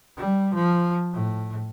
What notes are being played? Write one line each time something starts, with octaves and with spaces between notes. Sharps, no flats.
G3
F3
A2